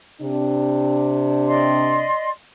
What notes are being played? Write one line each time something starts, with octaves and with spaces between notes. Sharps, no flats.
C3 D4
D5 D#5 C6